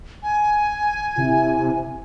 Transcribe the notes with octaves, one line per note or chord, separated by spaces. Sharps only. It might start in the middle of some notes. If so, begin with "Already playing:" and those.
G#5
C3 E4